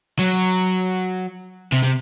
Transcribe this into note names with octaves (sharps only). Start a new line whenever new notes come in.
F#3
C3
C3